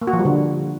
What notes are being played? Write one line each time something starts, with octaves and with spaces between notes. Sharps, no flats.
A#3
F#4
F3
G3
D3